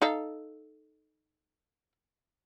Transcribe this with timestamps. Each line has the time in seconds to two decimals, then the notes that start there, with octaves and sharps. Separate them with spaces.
0.02 D#4 A4 F5